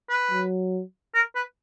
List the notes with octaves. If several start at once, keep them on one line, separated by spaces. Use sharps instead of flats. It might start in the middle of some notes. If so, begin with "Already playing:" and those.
B4
F#3
A#4
B4